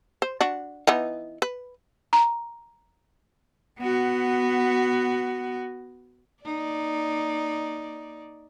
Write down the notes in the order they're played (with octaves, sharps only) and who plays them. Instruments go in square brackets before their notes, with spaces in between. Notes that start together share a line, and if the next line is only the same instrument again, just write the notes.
[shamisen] C5
D4 F#4
E3 B3 D#4
B4
[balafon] A#5
[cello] B3 F#4
[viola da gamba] A#3 D#4 D5